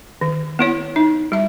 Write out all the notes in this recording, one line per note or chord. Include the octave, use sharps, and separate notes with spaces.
D#3
B3 E4 C#5
D#4
G3 E5